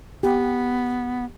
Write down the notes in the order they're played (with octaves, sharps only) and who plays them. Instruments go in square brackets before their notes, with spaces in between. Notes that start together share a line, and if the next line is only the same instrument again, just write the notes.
[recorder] B3 [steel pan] G4